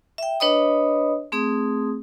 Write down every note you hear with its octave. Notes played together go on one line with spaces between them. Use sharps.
E5 G5
D4 B4 C#5 D#5 B5 D#6
A3 C4 G#4 D#6